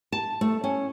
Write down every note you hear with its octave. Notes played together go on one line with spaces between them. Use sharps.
A5
A3
C#4